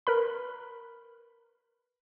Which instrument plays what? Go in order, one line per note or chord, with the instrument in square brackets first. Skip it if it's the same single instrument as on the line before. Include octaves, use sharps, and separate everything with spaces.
[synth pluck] A#4 B4 B5